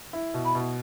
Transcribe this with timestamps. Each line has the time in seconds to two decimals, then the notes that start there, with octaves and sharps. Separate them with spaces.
0.13 E4
0.34 B2
0.45 B5
0.55 B2